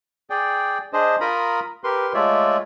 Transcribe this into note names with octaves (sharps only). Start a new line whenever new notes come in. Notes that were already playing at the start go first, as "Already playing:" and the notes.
G#4 D5 G5
D4 G#4 C5 D#5
F4 A#4 A#5 B5 D#6
G4 A#4 B4 C6
G#3 A3 F4 C#5 D5 E5